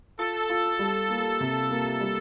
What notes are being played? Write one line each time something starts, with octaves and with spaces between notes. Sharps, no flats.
F4 A4
F4
G3
A#3
C3
A#3
G3